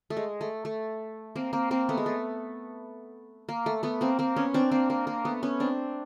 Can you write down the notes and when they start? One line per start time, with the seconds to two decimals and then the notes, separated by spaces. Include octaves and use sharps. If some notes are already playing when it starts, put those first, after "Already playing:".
0.10 A3
0.17 G#3
0.41 A3
0.65 A3
1.36 A#3 C4
1.53 A#3 C4
1.71 A#3 C4
1.89 A3 B3
1.97 G#3
2.06 A3
3.49 A#3
3.66 A3
3.83 A3 B3
4.01 A#3 C4
4.19 A#3 C4
4.36 B3 C#4
4.54 C4 D4
4.71 A#3 C4
4.90 A#3
5.07 A#3
5.25 A3 B3
5.43 B3 C#4
5.60 C4 D4